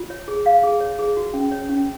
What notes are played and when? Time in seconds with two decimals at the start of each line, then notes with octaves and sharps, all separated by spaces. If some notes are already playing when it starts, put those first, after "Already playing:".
Already playing: F4
0.10 C#5
0.28 G#4
0.46 F5
0.63 G#4
0.80 C#5
0.99 G#4
1.17 F#4
1.34 C#4
1.51 C#5
1.69 C#4